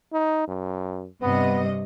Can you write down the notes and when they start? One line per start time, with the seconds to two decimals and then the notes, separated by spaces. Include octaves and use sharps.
0.13 D#4
0.48 F#2
1.22 G2 C3 B3 D#5